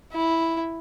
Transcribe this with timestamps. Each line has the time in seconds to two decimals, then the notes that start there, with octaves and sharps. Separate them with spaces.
0.13 E4